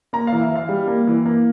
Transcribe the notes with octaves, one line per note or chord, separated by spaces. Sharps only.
A#3 A#5
F5
E3
E5
E3
F5
G3
A#3
E3
A#3